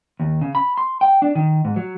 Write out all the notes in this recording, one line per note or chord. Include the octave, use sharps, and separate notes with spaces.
D#2
C#3
B5
C6
G5
D4
D#3
G#2
F#3